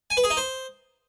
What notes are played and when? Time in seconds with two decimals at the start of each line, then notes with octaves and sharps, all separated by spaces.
0.10 G#5
0.17 B4
0.24 G#4
0.30 D#4
0.37 C5